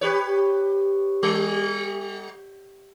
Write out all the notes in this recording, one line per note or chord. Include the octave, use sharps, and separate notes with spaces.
G4 B4 C#5
G3